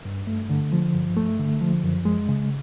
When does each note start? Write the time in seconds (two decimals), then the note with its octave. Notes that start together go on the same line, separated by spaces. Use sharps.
0.05 G2
0.27 A3
0.50 D3
0.72 F3
0.94 G2
1.17 A3
1.39 D3
1.61 F3
1.83 F#2
2.05 G#3
2.28 C#3